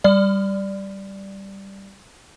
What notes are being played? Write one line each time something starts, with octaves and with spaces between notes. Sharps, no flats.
G3 D5